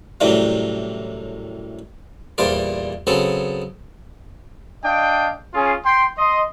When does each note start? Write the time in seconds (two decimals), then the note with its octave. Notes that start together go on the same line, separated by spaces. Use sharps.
0.21 F#2 A2 C3 E3 G3
2.38 E2 A#2 G3 F4 C5 D5
3.07 C#3 F#3 B3 C4 A4
4.84 D4 D#5 F5 G5
5.54 C#4 F4 G#4
5.85 G5 C6
6.17 D#5 C6